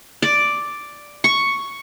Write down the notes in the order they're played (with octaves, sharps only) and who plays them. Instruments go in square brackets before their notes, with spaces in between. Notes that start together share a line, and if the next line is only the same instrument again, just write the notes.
[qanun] D5
C#6